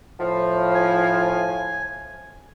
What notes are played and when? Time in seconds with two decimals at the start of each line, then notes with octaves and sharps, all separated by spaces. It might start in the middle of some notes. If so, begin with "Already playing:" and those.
0.20 A2 F3
0.74 G#5